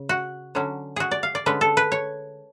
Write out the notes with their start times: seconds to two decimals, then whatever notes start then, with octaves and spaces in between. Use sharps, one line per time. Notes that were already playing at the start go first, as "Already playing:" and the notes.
Already playing: C#3
0.09 F#4
0.55 D3 F#3 C#4
0.96 F#4 G#4
1.11 D5
1.23 F5
1.35 D5
1.46 D3 G#3 C#4 B4
1.61 A4
1.77 B4
1.92 C#5